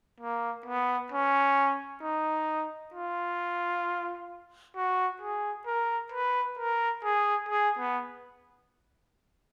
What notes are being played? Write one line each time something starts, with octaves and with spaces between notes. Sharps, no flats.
A#3
B3
C#4
D#4
F4
F#4
G#4
A#4
B4
A#4
G#4
G#4
B3